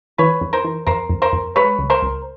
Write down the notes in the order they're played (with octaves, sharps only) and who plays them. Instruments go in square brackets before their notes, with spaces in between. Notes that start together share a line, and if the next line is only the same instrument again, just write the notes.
[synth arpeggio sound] E3 [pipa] B4 C#5
[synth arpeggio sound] F2
[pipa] A#4 C5
[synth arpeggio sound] E3
[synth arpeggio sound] F2 [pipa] A#4 C5
[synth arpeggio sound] F2
[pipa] A#4 C5
[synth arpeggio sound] F2
[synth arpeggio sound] G#3 [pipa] B4 C#5
[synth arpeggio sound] C#2
[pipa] A#4 C5
[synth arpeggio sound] C#2